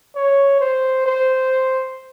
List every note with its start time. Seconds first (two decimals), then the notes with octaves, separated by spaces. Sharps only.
0.15 C#5
0.61 C5
1.06 C5